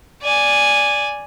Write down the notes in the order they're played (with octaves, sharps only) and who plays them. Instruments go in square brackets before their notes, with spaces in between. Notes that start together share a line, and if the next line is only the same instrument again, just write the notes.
[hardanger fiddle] D5 G#5